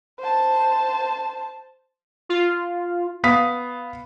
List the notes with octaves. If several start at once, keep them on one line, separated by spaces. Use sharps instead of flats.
C5 A5
F4
B3 F5 D#6 B6